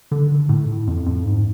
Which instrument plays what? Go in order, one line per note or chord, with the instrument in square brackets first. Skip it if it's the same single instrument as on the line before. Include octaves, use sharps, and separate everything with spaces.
[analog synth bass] D3
A2
F2
F2
G#2